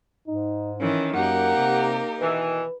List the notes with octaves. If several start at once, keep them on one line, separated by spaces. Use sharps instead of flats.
G#2 D#4
D#3 E3 C#4
F#2 A#3 D#4 G4 A#4 F#5
C3
B2 D#3 E3 B4